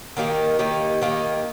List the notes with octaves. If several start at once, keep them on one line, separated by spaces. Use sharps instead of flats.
D#3 A#3 D#4 G4
D#3 A#3 D#4 G4
D#3 A#3 D#4 G4